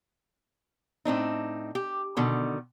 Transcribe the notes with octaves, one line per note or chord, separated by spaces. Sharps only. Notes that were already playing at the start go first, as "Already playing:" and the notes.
A2 C4 D4 D#4
G4
B2 D3 D#3